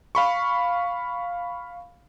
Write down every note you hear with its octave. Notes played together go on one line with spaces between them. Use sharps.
F5 B5 C#6